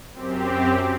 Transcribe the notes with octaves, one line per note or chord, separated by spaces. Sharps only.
F#2 C4 G4